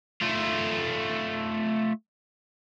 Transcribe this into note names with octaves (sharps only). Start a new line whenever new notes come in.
A3 F4